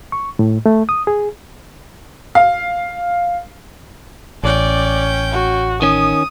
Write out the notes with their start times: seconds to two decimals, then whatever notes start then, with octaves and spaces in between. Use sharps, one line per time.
0.12 C#6
0.39 A2
0.66 A3
0.89 D#6
1.07 G#4
2.35 F5
4.43 A1 C#4 D5 G5
5.32 F#4
5.82 D#3 C#4 D#6